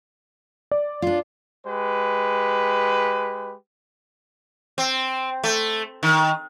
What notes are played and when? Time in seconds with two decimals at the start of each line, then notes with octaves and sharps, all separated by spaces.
0.71 D5
1.02 D4 F4
1.67 G#3 G4 B4
4.78 C4
5.44 A3
6.03 D#3